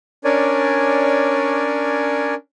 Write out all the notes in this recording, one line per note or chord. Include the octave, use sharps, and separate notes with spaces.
C#4 D4 A#4 C#5 D5 G#5